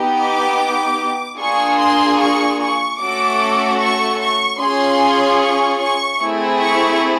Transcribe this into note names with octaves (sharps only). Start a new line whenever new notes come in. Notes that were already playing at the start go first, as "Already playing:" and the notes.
Already playing: B3 D#4 G4
D6
A#3 D4 F4 G#4 C#6
C6
C#6
C#6
A3 C#4 F#4 A4 D6
C#6
C#6
C#4 F4 G#4 C6
C#6
C#6
A3 C4 E4 G#4
C#6